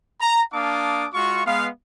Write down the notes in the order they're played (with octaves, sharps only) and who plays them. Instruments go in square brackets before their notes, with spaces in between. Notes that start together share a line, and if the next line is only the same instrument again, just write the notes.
[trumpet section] A#5
A#3 D4 F5 A5 D6 D#6
G#3 F4 F#4 F5 C#6
G#3 B3 F5